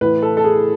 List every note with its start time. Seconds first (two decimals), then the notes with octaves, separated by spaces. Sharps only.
0.01 A2 E3 B4
0.22 A4
0.37 A4
0.44 G#4